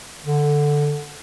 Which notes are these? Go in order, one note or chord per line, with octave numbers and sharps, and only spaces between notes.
D3